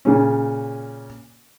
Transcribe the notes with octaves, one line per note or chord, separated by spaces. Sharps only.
A#2 C#3 C#4